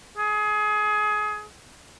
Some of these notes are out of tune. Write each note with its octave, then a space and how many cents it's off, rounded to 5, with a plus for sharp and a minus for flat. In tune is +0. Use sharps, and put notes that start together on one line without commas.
G#4 +25